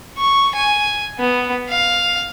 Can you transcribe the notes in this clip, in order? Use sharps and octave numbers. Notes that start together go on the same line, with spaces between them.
C#6
G#5
B3
F5